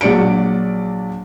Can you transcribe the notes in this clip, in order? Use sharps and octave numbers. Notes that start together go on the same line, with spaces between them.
A#1 F#3 D5 C#7 D7